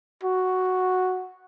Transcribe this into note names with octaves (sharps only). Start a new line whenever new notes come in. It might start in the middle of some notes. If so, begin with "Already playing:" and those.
F#4